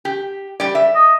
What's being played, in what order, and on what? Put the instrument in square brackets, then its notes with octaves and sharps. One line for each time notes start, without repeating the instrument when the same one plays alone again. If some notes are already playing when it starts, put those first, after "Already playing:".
[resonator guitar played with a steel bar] G4
G3 D5
E5
[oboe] D#5